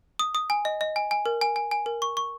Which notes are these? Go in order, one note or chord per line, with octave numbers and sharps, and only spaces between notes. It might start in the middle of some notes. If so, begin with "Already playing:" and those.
D#6
D#6
G#5
D#5
D#5
G#5
G#5
A#4
G#5
G#5
G#5
A#4
C#6
C#6